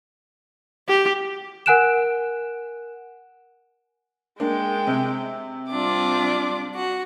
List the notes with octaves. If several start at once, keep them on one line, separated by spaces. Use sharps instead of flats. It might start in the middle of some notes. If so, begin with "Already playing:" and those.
G4
A#4 F#5 G#5 F#6 D7 E7
G#3 A#3 D4 G5
C3
G3 C4 D4 F4 D6
F#4